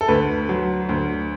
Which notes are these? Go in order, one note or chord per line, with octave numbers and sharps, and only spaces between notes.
A4
D2 B4
F#3
D2